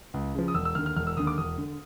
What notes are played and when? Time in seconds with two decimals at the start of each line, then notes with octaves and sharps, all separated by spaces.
0.14 C#2
0.35 C#3 F3
0.48 D#6
0.55 E1 E6
0.65 E6
0.75 D#2 F6
0.78 D3
0.86 F6
0.96 E1 F6
1.07 E6
1.17 D#2 D3 D#6
1.27 D6
1.38 E1 D#6
1.58 D3